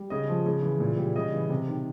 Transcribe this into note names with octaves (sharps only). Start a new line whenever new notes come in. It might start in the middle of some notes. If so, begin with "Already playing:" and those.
Already playing: G3
C#3 D#5
F3
C#3
E3
A#2
G3
C#3 D#5
E3
C3
D#3